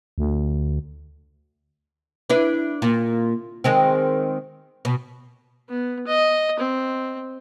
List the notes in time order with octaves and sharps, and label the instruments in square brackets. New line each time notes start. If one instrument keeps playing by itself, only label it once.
[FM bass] D2
[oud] D4 E4 B4
A#2
D#3 G#3 C4
B2
[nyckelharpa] B3
D#5
C4